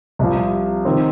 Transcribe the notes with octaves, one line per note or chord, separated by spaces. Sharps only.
C2 C3 F3
D#3 C4